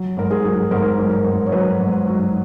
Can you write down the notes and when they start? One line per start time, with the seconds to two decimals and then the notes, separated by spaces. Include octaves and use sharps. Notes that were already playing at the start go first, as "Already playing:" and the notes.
Already playing: F#3
0.17 G#2 A#4
0.31 G#4
0.44 F#3
0.71 G#2 A#4
0.98 F#3
1.11 A#4
1.25 G#2
1.46 C#5
1.52 F#3 B4
1.80 G#2
2.08 F#3